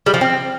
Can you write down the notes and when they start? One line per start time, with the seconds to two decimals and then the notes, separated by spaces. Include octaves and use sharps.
0.06 G3
0.14 F3
0.21 C4